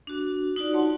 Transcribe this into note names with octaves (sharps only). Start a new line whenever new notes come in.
D4 F#4
D#4 F4 F#4 D5
C#5 F#5 A5 C6